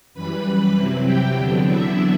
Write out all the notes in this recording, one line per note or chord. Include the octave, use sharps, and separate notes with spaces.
F#2 E3 G3 B4 B5
C3 F#3 C4 E4
G4 G5
E2 D3 F#3 B3 D4
E4 E5